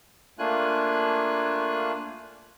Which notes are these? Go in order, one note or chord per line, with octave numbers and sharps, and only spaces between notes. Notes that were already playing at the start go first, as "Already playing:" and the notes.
A3 A#3 D4 F4 G#5 F#6